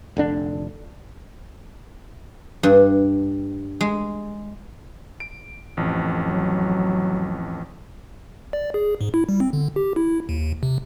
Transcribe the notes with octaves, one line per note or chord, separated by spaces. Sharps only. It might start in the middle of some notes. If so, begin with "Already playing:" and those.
F1 D3 D4
G2
G#3
D7
A1 F2
F#3
D5
G#4
G#2
E4
G3
C4
D3
G4
E4
D#2
C3